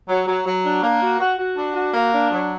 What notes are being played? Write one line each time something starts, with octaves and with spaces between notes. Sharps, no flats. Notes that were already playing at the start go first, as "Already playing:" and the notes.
F#3
F#3
F#3
D4
A#3
F#4
F#4
F#4
D4
F#4
A#3
D4
F#3